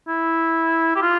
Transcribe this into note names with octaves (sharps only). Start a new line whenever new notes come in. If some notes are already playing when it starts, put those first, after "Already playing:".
E4
G4
F4